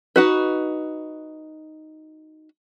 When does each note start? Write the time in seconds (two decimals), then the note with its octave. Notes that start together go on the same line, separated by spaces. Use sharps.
0.16 D#4 F#4 B4